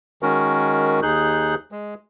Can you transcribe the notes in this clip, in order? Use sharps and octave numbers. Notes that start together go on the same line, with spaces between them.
D#3 G#3 C#4 F#4 A#4
D#2 D#4 G#4 F#6 G6
G#3